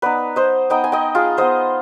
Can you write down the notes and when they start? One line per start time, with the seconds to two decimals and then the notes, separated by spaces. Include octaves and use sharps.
0.02 B3 D#4 B4 D5
0.36 C5 D#5
0.70 B3 D#4 D#5 G5
0.84 G#5
0.92 D#5 G5
1.15 F4 G#4
1.37 B3 F4 C5 D#5